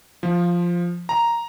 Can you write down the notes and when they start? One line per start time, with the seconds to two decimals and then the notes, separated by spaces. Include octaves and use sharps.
0.23 F3
1.09 A#5